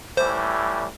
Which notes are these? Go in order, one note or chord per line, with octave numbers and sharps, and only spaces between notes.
A2 E3 G3 C5